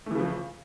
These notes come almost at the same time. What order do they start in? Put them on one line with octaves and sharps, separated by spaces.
A3 E3 C#3 F3